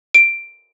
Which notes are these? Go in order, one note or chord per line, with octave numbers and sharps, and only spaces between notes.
D7